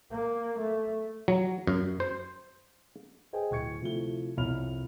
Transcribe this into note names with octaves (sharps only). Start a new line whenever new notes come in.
A#3
A3
F#3
F#2
C5
G#4 C5 D#5 G5 G#5
D1 C#6 G#6 C#7
C3 F3 A3 E4 G7
C2 F2 C#5 B5 F6 F7